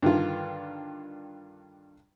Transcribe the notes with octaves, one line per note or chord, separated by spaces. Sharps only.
G2 D3 D#3 D4 F4